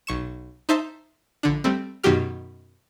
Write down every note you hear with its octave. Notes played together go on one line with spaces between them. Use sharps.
B1 C#6 E7
D#4 C5 E5 A5 C6
A#1 D3 D4
G3 A3 C4
F#2 B2 D#3 F#3 G4 F6